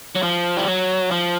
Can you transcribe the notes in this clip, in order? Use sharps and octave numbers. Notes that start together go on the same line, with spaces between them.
F#3
F3
G3
F#3
F3